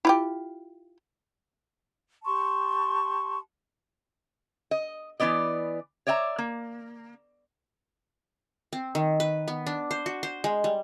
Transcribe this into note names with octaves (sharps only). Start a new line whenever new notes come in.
E4 F4 G4
G4 A5 C6 C#6
D#5
E3 A3 B3 D5 D#5
C#5 D5 E5 F#5 A#5
A#3
C4
D#3
B4
B3
D4
C5
F#4
C5
G#3
G3